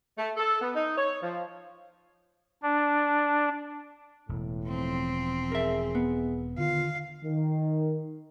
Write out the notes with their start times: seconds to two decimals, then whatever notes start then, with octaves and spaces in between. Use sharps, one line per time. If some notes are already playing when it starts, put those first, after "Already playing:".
0.18 A3
0.37 A4
0.62 B3
0.74 D#4
0.98 C#5
1.23 F3
2.63 D4
4.29 E1 A2
4.66 F3 C4
5.52 G#4 A#4 E5
5.95 B3
6.58 D3 D#3 F4 F5
7.23 D#3